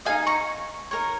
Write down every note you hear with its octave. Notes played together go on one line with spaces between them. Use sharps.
D#4 G#4 D#5 F5 G#5
A#5 C#6
D#4 A#4 C#5